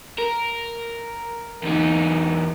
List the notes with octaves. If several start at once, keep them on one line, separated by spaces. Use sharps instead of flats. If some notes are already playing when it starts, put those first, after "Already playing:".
A#4
E2 D#4